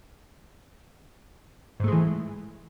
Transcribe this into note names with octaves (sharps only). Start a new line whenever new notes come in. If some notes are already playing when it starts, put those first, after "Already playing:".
G#2 E3 G#3 A3